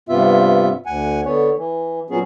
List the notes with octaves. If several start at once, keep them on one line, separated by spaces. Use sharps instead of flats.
G2 C3 B3 F4 E5
D2 F#5 G#5
D3 B3 C#5
E3
A#2 F#3 B3 C#4 G#4